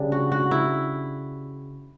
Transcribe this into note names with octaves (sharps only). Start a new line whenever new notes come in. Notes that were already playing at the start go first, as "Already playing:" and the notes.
Already playing: C#3 G3 D4
F#4
F#4
E4